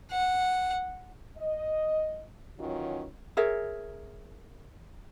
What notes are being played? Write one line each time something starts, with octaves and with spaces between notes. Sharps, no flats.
F#5
D#5
D#3 E3 F#3 C#4 F4 F#4
G#4 A#4 C#5 E5